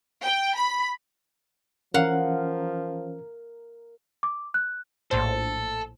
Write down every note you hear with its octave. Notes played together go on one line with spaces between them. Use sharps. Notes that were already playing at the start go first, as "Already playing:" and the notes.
G5
B5
E3 F3 C#4 A#4 F5 F#5
D6
F#6
A#1 A2 A4 C5